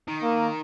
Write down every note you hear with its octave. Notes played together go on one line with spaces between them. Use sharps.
D#3
A#3